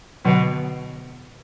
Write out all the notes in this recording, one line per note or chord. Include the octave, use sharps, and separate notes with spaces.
B2 D3 F#3 B3